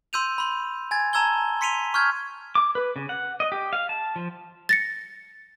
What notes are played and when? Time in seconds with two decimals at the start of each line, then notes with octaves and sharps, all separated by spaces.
0.13 C6 E6 G6 D#7 F7
0.38 B5 C6
0.91 G#5 G#6 A6
1.13 A5 A#5 E6 G#6 G7
1.61 C6 B6 C#7 D#7 F7 G7
1.94 C#6 F6 G6 G#6
2.55 D6
2.75 B4
2.96 C#3
3.09 F#5
3.40 D#5
3.52 G4
3.73 F5
3.89 A5
4.16 F3
4.69 A6 A#6 C#7